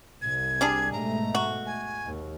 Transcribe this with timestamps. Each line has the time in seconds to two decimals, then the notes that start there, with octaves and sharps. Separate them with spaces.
0.22 C2 G#6
0.61 G3 D4 G#4
0.92 G#2 B2 A3 A#5
1.35 F#4
1.66 G#5
2.04 D#2